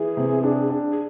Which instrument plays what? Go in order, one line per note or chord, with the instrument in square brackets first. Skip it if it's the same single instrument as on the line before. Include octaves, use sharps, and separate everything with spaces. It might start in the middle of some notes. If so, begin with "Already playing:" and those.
Already playing: [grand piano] E3 [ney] G#4
[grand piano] C3
D4
D4
[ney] G#4